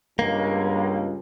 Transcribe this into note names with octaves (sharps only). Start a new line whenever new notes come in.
C#2 G2 A#3